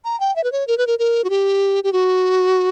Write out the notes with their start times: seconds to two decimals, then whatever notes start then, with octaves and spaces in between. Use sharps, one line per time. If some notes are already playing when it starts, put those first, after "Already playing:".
0.05 A#5
0.20 G5
0.36 E5
0.44 B4
0.52 C#5
0.67 A#4
0.78 B4
0.87 A#4
0.99 A#4
1.24 F#4
1.30 G4
1.84 G4
1.93 F#4